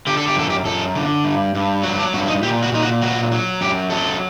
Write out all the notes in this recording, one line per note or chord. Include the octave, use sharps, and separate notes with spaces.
D3 G4
A4
G4
F#2 A4
G4
F#2 A4
D3
G2
G2
F#3 F#4
D4
G2 F#4
D#4
A#2 G4
F#4
A#2 D#4
F#4
F#3 F#4
F#3
F#2 G4
F#3 A4